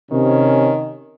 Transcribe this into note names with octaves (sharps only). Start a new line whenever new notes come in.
C3 D#3 C#4